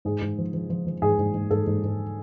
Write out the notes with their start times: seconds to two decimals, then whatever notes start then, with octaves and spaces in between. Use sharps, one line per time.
0.05 G#2 G#4
0.22 G#2
0.38 F3
0.54 F3
0.70 F3
0.87 F3
1.02 G#2 G#4
1.19 G#2
1.34 G#2
1.51 G#2 A4
1.67 G#2
1.83 G#2